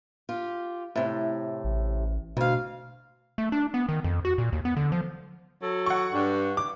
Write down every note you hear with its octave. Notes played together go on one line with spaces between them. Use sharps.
F4 G4
A2 C3
A1
D2 B2 F5
A3
D4
B3
D#3
F2
F#4
A#2
D#2
B3
D3
F3
F#3 A4
F#5 C#6
G2
D6